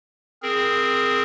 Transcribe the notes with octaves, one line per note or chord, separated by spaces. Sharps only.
C4 G#4 A#4